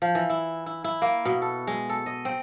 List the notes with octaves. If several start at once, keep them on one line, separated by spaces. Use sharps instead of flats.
F3
E3
E4
E4
E4
A#3
B2
A4
G#3
A4
D#5
C4